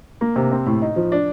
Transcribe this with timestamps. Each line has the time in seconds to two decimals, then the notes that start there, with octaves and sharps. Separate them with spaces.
0.21 A#3
0.36 C3
0.52 C4
0.66 A2
0.82 D#4
0.96 F3
1.12 D4